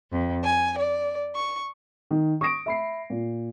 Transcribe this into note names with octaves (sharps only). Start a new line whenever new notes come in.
F2
G#5
D5
C#6
D#3
C#6 D#6 A#6 D7
E5 B5 C7
A#2